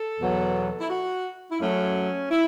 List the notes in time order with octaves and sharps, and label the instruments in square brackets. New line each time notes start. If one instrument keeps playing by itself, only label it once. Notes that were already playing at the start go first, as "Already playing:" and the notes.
Already playing: [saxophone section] A4
E2 B2 F#3
E4
F#4
E4
F#2 F#3 A3 C#4
E4